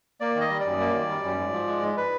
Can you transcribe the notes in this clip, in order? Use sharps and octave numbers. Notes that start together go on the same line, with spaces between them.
A#3 D5
D#3
D#5
G3
D5
F#2
A#3
D#3
G3
F#2
G#2
F3
G#3
G#2
B4